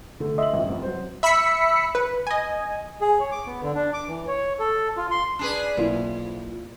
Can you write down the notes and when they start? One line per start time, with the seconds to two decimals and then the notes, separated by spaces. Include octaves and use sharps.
0.20 D3 F3 A3
0.38 D#5 E5 C6 F#7
0.54 A1 G2 F3
0.69 F1 C4
0.82 F#3 C5
1.23 E5 B5 E6 B6 C#7
1.95 B4
2.27 D#5 G#5
3.01 G#4
3.20 C#5
3.32 D6
3.46 B3
3.62 D3
3.75 D4
3.93 D6
4.08 E3
4.28 C#5
4.59 A4
4.97 F4
5.11 C6
5.39 D4 G#4 B4
5.77 B1 F2 A#3 E4 F4